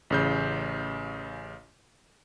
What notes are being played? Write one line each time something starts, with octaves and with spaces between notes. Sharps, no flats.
A1 C#3 G6